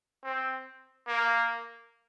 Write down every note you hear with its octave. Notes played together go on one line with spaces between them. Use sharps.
C4
A#3